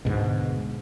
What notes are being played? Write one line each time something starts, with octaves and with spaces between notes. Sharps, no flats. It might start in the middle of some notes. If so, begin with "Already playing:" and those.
D2 G#2 B2